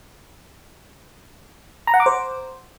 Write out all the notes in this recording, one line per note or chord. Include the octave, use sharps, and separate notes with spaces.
A#5
F#5
D6
C5